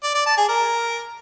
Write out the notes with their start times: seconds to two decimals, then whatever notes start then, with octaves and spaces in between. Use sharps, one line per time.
0.03 D5
0.15 D5
0.26 A5
0.37 G#4
0.49 A#4